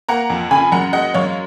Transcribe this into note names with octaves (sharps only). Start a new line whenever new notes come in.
A#3 F#5 A#5
F2
C#3 G#5 B5
F#2 F#5 A#5
G#3 D#5 F#5
F#2 C#5 F5